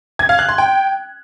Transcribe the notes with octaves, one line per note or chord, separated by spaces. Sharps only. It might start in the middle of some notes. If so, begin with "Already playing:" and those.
G#6
F5
F#6
C6
G5